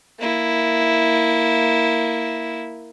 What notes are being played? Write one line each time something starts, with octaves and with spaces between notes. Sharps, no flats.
A#3 E4